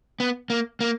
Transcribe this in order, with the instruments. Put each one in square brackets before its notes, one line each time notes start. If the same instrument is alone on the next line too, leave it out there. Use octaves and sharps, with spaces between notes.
[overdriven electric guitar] B3
A#3
A#3